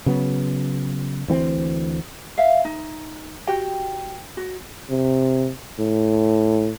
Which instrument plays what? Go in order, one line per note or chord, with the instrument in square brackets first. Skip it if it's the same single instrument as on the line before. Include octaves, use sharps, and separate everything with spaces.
[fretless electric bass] C#3 F#3 B3
D2 E3 B3 C4
[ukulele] E5 F5
D#4
F#4 G4 G5
F#4
[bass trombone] C3
A2